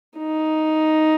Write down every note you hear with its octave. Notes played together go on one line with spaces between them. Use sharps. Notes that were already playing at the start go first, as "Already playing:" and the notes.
D#4